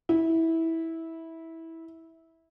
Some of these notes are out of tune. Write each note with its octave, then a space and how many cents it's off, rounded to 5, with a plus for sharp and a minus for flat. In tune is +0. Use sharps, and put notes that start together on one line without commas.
E4 -15